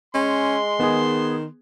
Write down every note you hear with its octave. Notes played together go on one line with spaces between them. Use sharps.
G#3 C#4 C6
D#3 B3 G#4